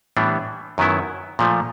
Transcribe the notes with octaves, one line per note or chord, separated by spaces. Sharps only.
A2 E3 G3 B3 D4
F#2 D#3 F#3 B3 E4
A#2 F3 A3